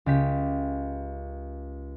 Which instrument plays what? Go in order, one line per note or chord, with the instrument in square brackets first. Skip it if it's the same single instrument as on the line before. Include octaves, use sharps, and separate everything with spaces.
[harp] C#2 G4 B6